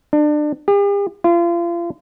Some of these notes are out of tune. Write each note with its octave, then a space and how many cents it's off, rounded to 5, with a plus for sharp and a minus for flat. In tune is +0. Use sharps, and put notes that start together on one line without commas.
D4 +30
G4 +45
F4 -35